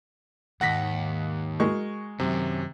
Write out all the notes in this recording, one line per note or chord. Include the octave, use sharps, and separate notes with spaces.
D#2 G#2 D#3 F#5 A#6 B6
G#3 F#4 A#4 C#6
F#2 C3 D#3 F#3